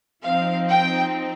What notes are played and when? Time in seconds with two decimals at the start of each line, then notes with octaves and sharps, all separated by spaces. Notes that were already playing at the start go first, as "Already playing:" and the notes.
0.23 F3 C4 D#4 F5
0.70 G5